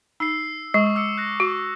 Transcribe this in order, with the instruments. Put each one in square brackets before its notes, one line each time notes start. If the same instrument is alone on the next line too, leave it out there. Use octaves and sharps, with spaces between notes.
[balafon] D#4 [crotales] E6 C7
[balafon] G#3 [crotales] C#6 D#6
[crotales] D6 E6 C#7
F#6 A#6
[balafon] F#4